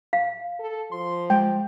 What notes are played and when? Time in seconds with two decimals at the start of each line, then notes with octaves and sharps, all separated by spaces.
0.13 F5
0.59 A4
0.92 F3 C6
1.30 G#3 G5